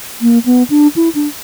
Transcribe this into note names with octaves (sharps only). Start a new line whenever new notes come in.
A#3
B3
D4
E4
D4